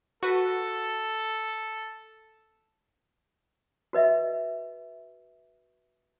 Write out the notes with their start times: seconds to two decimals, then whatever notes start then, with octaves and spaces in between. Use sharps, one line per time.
0.23 F#4 A4 B4
3.93 F#4 B4 D#5 E5